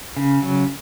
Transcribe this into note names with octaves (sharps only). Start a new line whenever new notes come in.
C#3
F#3